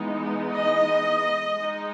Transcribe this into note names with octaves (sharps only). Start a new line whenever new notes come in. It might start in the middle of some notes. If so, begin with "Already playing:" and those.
Already playing: E3 G#3 B3 D#4
D#5
G#3 D#4